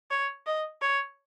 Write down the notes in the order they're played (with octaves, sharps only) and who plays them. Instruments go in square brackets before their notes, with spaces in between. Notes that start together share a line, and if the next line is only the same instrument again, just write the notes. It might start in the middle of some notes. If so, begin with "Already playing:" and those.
[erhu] C#5
D#5
C#5